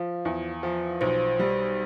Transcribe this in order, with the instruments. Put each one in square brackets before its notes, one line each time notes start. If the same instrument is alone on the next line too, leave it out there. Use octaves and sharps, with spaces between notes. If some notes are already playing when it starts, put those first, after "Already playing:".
Already playing: [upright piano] F3 [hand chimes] F5
[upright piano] E2
F3
[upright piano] B1 [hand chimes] C5
[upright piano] G3